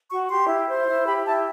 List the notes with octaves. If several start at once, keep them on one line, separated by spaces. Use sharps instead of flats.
F#4 C#6
G4 C6
E4
C5
E4
G4 B5
E4 A5